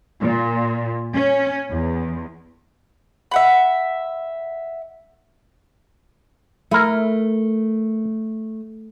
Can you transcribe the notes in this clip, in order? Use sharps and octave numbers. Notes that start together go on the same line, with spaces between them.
A#2
C#4
E2
E5 F#5 B5
A3 E4 A#4